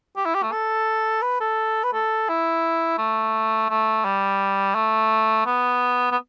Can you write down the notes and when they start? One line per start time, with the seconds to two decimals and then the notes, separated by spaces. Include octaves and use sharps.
0.17 G4
0.25 E4
0.35 G4
0.43 A3
0.52 A4
1.22 B4
1.40 A4
1.84 B4
1.93 A4
2.29 E4
2.98 A3
3.70 A3
4.05 G3
4.75 A3
5.46 B3
6.12 B3